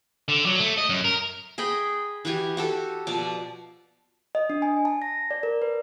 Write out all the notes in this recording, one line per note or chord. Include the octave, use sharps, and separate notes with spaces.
D3
F#3
A3
D#5
F#2
A#4
G#4 D#5 G5 B5
E3 F#4 G4 G#5
F#4 G4 A4
B2 F3 D5
D#5
D4
G#5
A5
A#6
D5
A#4
B4